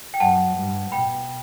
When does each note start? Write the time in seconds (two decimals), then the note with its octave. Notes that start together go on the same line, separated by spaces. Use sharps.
0.14 G5
0.20 F#2 F#5 A5
0.57 G2
0.92 B2 G5 B5